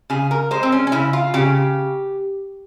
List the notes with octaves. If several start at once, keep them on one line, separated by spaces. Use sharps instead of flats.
C#3 G#4
A#4
G#3 C5
C4
C#4
C#4
C#3 E4
F4
C#3 G4